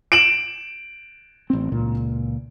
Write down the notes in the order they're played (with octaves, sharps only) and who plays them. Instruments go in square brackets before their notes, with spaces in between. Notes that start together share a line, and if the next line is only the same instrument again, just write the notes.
[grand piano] D7 E7 F#7
[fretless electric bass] A1 C4
C#2 A#2